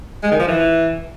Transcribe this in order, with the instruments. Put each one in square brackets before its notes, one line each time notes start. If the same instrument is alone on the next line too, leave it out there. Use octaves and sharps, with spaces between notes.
[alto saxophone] G#3
D#3
F3
E3